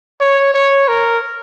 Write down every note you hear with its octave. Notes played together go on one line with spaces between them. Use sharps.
C#5
C#5
A#4